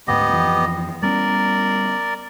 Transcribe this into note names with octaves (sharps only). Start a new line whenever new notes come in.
D2 G#2 B3 G4 D#5
F2 E3 F3
G3 B3 C#4 A#4 D5